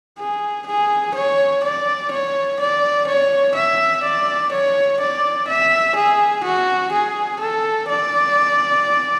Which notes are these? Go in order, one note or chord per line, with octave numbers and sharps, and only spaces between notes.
G#4
G#4
C#5
D5
C#5
D5
C#5
E5
D5
C#5
D5
E5
G#4
F#4
G#4
A4
D5